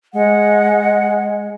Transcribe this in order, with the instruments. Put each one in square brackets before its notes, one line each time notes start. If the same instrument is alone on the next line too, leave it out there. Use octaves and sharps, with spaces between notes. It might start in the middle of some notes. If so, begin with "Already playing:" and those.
[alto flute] G#3 [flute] F#5